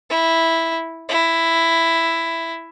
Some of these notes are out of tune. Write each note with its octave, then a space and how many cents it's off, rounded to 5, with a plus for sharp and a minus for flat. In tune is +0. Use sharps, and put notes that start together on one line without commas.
E4 -5
E4 +5